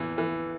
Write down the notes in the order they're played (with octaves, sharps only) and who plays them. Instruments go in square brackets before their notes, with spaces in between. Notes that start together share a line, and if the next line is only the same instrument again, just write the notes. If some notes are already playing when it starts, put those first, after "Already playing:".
Already playing: [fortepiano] E2 E3
E3